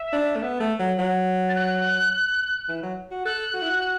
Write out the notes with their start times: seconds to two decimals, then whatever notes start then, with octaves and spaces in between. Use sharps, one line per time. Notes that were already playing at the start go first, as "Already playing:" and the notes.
Already playing: E5
0.13 D4
0.36 A3
0.42 B3
0.60 A3
0.80 F#3
0.99 F#3
1.49 A6
1.55 F#6
2.69 E3
2.83 F#3
3.11 F#4
3.25 A4 F#6
3.54 F#4
3.62 E4
3.70 F#4